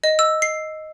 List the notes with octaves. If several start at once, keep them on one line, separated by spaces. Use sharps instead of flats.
D#5
E6
C7